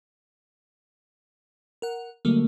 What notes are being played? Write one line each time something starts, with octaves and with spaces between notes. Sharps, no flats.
A#4 F#5
D3 F#3 G3 A3 A#3